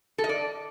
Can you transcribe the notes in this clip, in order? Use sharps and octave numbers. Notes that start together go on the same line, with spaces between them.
A4
D#5
D5